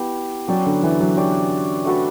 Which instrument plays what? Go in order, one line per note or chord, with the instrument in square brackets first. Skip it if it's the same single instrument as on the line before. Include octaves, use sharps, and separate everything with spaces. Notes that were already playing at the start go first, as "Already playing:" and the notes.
Already playing: [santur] B3 E4 G4
[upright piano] F#3 [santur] C#4 G4 D5
[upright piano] D3
E3
F#3
[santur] C#4 G4 D5
A3 D4 F#4 B4